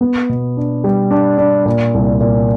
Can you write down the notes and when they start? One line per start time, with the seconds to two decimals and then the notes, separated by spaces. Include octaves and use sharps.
0.01 B3
0.29 B2
0.57 D4
0.84 G3
1.11 D4
1.38 D4
1.66 A#2
1.94 C2
2.20 A#2